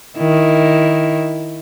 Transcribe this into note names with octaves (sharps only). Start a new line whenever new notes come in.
D#3 E4